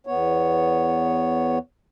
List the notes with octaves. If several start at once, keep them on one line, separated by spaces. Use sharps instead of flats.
E2 B3 C#5